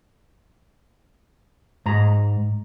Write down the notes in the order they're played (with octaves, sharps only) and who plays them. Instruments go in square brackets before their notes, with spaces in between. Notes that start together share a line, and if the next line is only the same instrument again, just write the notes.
[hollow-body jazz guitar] G#2 A#5